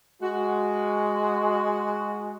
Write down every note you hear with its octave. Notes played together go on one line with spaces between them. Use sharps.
G#3 F#4